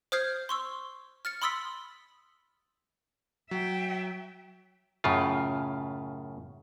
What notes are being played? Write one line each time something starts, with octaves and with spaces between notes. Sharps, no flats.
C5 D#6 F6 G6 G#6 C7
C6 C#6 E6
F6 A6 C#7
B5 C6 D#6 E6 A6 B6
F#3 E5 G5
F#2 A2 C#3 F4